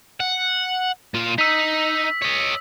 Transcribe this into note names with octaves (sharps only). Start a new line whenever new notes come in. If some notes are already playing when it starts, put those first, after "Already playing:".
F#5
A#2 F4
D#4 E6 B6
C#5 D#5